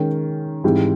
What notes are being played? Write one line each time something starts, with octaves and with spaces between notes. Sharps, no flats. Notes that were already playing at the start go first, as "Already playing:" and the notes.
Already playing: D#3 G#3 C#4
G#2 E3 G3 C4